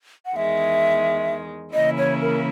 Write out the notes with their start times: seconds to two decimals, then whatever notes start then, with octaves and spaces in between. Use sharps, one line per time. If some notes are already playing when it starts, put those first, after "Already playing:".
0.26 F#5
0.36 E2 D#3 G#3 E5
1.74 C#3 E3 A#3 C#4 E4 D#5
1.98 C#5
2.21 A#4